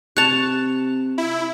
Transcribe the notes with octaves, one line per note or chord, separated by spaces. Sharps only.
C3 A5 C#6 F#6 F7
E4